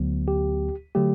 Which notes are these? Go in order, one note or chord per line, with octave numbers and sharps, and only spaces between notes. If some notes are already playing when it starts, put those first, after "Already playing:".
Already playing: D2 D3 F#3 B3
G4
D3 F#3 A3 G4